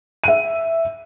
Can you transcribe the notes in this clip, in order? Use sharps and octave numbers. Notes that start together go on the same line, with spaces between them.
E5 D#7